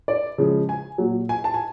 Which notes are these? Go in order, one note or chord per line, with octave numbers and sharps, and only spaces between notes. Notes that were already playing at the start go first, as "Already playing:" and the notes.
D5
C#3 F3 G#3
G#5
A#2 F#3
G#5
A5
G#5